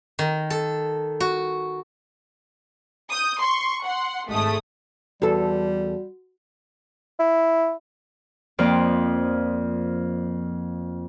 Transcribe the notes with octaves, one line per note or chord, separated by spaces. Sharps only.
D#3
A4
F#4
D#6 G6
C6 C#6
F#5 C6
G#1 G#3 A3 D#6
E2 G3 F#4 A4
E4
F2 F3 A#3 D5 D6